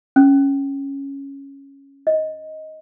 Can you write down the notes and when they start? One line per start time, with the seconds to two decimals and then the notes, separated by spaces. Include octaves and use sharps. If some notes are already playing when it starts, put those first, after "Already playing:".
0.16 C#4
2.07 D#5